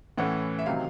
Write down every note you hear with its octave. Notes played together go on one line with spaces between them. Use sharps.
A2 E3 A3 C#4 F#5
E5
C3 D#3 F#3 F5